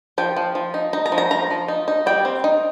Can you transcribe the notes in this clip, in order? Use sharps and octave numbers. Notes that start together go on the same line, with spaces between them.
F3 G5
F3
F3
D#4
D#4 A#5
A#5
F3
A#5
F3 A#5
F3
D#4
D#4
G3 G5
C4
D#4